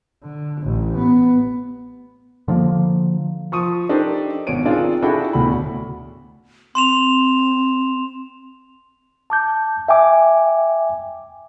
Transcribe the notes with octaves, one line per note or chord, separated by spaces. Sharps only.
D3
A1
B3
D3 F3 G#3 A#3
F3 C#6 D#6 D#7
D4 D#4 G4 A4 A#4 C5
G#1 B2 C#5 D7 D#7
C4 D4 D#4 F4 G#4 A#4
D4 E4 F#4 G#4 A4 G5
D1 D2 B2 B5
C4 C6 E7 F7
A5 D6 G6
E5 G5 G#5 D6